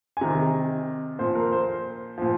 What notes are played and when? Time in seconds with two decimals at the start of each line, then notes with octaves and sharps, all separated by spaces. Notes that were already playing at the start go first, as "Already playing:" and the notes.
0.17 G#5
0.21 C3 D#3 A#5
1.19 A#2 F3 C5
1.35 A#4
1.52 C5
2.18 A#2 F3